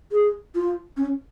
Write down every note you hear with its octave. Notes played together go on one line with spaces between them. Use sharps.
G#4
F4
C#4